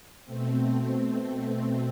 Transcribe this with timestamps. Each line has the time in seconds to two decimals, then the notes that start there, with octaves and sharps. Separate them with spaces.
0.25 B2 A3 C4